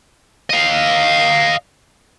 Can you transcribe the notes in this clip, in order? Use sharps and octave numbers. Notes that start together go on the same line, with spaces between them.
D#5 F5